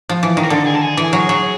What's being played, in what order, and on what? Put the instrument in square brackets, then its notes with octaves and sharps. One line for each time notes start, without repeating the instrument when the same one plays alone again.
[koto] F3
E3
D#3
[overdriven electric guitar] A#4
[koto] D3 [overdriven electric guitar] A4
[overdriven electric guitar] G#4
A4
G#4
[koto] E3
F#3
F#3